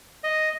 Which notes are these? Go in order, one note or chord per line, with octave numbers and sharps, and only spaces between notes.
D#5